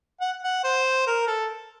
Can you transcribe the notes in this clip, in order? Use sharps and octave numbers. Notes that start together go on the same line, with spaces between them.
F#5
F#5
C5
A#4
A4